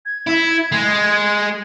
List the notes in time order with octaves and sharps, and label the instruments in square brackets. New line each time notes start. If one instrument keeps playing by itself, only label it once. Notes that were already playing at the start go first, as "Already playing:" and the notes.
[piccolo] G#6
[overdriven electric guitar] E4
G#3